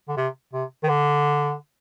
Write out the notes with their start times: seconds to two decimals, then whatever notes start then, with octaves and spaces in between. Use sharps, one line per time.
0.08 D3
0.17 C3
0.53 C3
0.83 D#3
0.89 D3